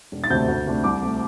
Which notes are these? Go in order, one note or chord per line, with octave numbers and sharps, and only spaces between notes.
E1
A6
D2 C3 A3 C4 G6
D2
C3 A3 D4
C2 D6
C3 A3